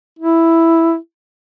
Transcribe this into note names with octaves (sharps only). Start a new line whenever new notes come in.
E4